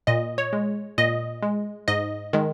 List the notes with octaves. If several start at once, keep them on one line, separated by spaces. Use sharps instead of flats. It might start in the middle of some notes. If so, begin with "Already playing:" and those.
A#2 D#5
C#5
G#3
A#2 D#5
G#3
G#2 D#5
D#3 G#3